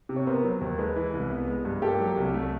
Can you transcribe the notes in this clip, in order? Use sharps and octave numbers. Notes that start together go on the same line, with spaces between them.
C3
C#5
B3 A#4 C5
F#3
D#2
G#3 A4 B4
E3
C2
B3
G#3
G2
A#3 G4 A4
F#3
C2
A3